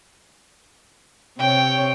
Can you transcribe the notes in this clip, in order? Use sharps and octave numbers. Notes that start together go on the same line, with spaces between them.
C3 C#5 G5